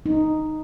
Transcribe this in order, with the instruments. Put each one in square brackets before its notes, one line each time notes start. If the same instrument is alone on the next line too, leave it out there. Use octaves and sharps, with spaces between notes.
[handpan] D#4